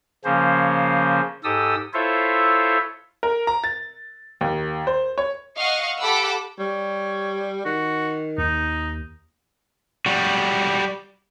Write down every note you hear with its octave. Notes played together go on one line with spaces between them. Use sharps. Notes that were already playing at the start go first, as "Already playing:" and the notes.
C#3 F3 A#3 C#4 C5
G#2 G4 A4 D#6 E6
E4 F4 A4 C5 C#5 E5
A#4
A#5
A6
D#2
C5
C#5
D#5 F5 F#5 C#6
G4 A4 F#5 B5 D6 E6
G3 C#5
D#3 F#4
D#2 D#4
G3 F#4